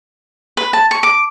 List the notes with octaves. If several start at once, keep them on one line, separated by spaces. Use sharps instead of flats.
B4
A5
C#6
D6